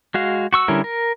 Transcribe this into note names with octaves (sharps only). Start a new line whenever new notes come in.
G#3 F#4 F5
F#4 C#6 E6
D3 G3 C#4 E4 A#4
A#4